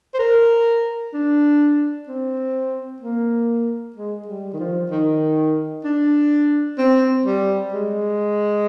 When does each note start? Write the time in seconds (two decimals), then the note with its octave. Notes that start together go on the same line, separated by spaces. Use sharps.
0.14 C5
0.19 A#4
1.14 D4
2.08 C4
3.02 A#3
3.96 G#3
4.28 G3
4.54 D#3
4.60 F3
4.91 D#3
5.85 D4
6.79 C4
7.26 G3
7.74 G#3